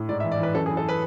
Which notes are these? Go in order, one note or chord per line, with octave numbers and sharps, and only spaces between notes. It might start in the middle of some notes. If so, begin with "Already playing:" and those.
Already playing: A2
G#2 D5
E5
E3
D5
E3 B4
F#2 A4
G#4
E3
A4
B4